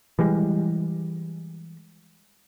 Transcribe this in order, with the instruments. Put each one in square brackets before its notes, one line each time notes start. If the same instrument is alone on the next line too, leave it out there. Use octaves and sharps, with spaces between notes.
[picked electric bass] E3 G3 G#3